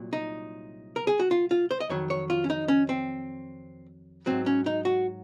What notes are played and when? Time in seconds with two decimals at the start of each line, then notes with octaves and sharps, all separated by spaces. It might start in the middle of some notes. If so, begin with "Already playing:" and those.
Already playing: C2 A#2 F#3
0.13 D#4
0.96 A#4
1.07 G#4
1.19 F#4
1.31 F4
1.51 F4
1.71 C5
1.80 D#5
1.89 F2 D#3 F#3 C#5
2.10 C#5
2.30 F4
2.44 C#4
2.50 D#4
2.68 C#4
2.89 C4
4.26 G#2 F#3 C4
4.46 C#4
4.66 D#4
4.85 F#4